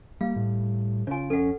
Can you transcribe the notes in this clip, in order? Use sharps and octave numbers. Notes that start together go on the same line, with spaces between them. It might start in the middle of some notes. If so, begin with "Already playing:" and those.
G3 A#3 F5
A2
C#3 F4 C#5 G#5
F2 C#4 A4 F#5